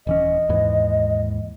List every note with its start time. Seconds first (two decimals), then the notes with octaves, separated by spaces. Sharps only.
0.07 D#1 E3 C#4 D#5
0.49 D#2 G#2 E3